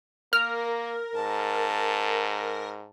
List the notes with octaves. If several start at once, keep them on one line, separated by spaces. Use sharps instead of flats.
A#3 A#4 F6
G#2 A5